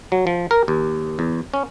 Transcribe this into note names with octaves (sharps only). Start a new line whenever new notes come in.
F#3
F3
A#4
D#2
E2
C#4